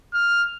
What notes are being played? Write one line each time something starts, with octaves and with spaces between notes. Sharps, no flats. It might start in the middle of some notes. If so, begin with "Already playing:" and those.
F6